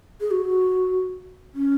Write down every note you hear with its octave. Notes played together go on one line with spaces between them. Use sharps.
G#4
F#4
C#4